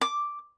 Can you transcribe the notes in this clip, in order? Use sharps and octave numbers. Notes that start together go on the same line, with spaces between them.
D6